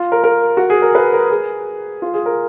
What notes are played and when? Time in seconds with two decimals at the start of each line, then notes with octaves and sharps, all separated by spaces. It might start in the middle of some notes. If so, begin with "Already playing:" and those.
Already playing: F4
0.12 A#4
0.24 A#4
0.57 F#4
0.70 G#4
0.82 A#4
0.95 B4
1.13 A#4
1.30 G#4
2.02 F4
2.14 G#4
2.26 A#4